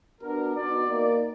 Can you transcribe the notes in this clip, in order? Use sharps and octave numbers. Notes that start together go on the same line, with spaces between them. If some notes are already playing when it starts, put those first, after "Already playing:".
B3 D4 F#4 A#4
B3 D#4 F#4 D5
A#3 D#4 A#4 D5